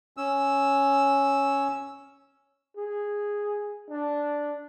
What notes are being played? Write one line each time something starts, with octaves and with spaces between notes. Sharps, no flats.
C#4 E6
G#4
D4